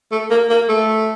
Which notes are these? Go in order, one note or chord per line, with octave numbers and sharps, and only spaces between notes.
A3
A#3
A#3
A3